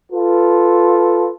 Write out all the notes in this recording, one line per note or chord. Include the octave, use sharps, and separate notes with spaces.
F4 A4 B4